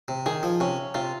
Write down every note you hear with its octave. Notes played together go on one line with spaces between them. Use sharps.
C3
D#3 G#4
F3
C3 C#4
C3 F4